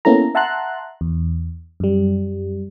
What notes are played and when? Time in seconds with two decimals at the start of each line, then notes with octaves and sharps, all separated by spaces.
0.05 A#3 B3 C#4 E4 A4 A#5
0.35 E5 F#5 A5 A#5 C6 F#6
1.01 E2
1.80 F#2 G3